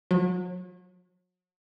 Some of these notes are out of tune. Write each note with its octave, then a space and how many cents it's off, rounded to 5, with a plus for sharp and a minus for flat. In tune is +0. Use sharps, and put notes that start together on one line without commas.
F#3 -35